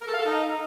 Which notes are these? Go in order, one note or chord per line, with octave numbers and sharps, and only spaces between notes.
A#4
A4
F5
A4
D#4